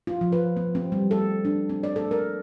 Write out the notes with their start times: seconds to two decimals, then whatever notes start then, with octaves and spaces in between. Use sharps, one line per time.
0.07 F4
0.21 F3
0.32 B4
0.57 B3
0.75 C4
0.92 G3
1.11 A4
1.45 D4
1.69 C4
1.84 D5
1.96 A4
2.11 A#4